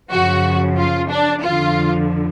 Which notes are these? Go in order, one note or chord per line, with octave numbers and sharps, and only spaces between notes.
F#2 C#3 F3 F#4
F4
D4
F2 D3 F3 F4